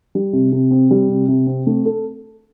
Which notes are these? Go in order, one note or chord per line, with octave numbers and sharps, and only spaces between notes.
G3
C3
C3
C4
G3
C3
C3
C4
A3
A4